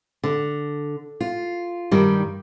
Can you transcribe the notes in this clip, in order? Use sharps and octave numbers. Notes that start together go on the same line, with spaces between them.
D3
F4
G2 D#3 G3